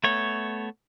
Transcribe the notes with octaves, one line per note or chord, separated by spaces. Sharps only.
A3 B3 C#5